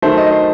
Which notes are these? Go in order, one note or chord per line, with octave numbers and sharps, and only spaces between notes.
D#3 F#3 A3 C5
D#5
C5